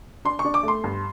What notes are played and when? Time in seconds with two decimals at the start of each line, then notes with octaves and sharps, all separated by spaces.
0.25 D4 C6
0.39 C#6
0.45 D4
0.54 D6
0.63 A3
0.68 C6
0.84 G2